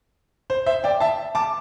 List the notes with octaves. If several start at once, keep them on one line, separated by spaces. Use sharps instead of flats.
C5
C5 E5
D5 G5
E5 A5
A5 D6